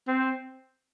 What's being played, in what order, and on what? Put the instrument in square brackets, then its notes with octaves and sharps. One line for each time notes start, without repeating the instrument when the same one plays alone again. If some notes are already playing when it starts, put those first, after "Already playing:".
[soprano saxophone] C4